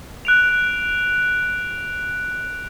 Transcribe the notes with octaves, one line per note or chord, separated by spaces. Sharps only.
F#6 D7 F7